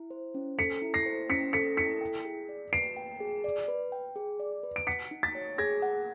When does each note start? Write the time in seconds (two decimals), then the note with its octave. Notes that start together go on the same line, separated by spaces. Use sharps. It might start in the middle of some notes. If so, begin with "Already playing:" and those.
Already playing: E4
0.10 C5
0.34 C#4
0.58 A4 B6 C#7
0.82 E4
0.94 A#6 C7
1.06 C5
1.30 C#4 B6 C#7
1.53 A4 B6 C#7
1.77 E4 B6 C#7
2.01 G5
2.25 G#4
2.49 D5
2.72 B4 C7 D7
2.97 G5
3.20 G#4
3.44 D5
3.68 B4
3.92 G5
4.16 G#4
4.40 D5
4.63 B4
4.76 D7
4.87 F#5 B6 C#7
5.11 D#4
5.23 A6 B6
5.35 C#5
5.58 G#4 G#6 A#6
5.82 F#5